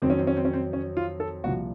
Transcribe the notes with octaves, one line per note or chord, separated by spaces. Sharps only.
F2 D#3 F#3 C4
C#4
C4
C#4
C4
C#4
C4
C#4
F4
A4
C2 A#2 F3 F#4